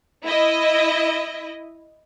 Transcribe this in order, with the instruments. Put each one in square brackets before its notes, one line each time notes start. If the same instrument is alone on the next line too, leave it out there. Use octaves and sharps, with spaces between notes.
[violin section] E4 D#5